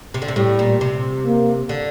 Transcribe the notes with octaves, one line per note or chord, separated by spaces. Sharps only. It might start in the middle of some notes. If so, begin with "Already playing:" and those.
C3
D3
C3
A2 G3
A#2
C3
A#3
D3